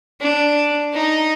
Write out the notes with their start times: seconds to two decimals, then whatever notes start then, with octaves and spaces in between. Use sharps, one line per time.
0.20 D4
0.93 D#4